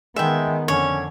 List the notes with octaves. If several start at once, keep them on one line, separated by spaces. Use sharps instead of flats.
D#3 G#3 B3 E5 G5
F2 D3 C#4 C#5